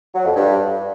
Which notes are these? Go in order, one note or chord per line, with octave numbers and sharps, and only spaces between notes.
F#3
F2
G2